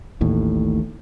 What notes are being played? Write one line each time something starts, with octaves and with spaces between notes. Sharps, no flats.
A1 D#2 A2